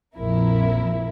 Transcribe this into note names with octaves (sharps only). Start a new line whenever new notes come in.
A#1 F2 F3 E4 A#4